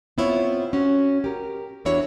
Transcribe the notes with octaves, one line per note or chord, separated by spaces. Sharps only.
B3 C4 E4 F4 C5 C#5
C#4 F#4
G4 A#4
E2 D4 E4 F#4 C#5